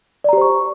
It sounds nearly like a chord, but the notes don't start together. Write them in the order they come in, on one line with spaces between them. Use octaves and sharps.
D5 A#5 G4 C5 C#6